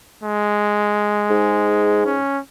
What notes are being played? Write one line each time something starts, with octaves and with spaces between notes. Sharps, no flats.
G#3
G#2
C#4